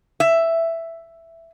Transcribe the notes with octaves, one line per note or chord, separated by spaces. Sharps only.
E5